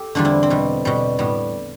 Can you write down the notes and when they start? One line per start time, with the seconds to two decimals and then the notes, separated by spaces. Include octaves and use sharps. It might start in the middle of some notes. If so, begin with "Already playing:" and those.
Already playing: G4 A4
0.15 E2 D3 G3 D4 F4
0.25 C4 E4
0.43 C4
0.50 B2 G3
0.85 B2 G3
1.19 A2 G3 B3